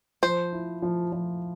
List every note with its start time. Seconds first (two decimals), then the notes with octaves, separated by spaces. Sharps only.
0.23 F3 C5
0.53 E4
0.82 F3
1.12 F3